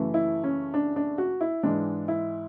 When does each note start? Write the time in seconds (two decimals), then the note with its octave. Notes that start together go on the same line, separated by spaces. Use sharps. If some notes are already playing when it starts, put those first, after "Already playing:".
Already playing: F#2 C#3 E3 A3
0.14 E4
0.44 C#4
0.74 D4
0.96 D4
1.18 F#4
1.41 E4
1.63 G#2 E3 G#3 D4
2.08 E4